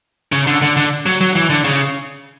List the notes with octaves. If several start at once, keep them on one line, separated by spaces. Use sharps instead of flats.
C#3
D3
D3
D3
F#3
F#3
E3
D3
C#3